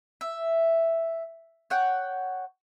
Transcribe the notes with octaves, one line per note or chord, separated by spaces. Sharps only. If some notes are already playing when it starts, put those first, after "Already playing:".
E5
C#5 F#5 G5